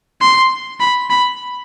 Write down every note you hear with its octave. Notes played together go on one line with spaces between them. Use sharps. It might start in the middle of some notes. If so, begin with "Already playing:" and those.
C6
B5
B5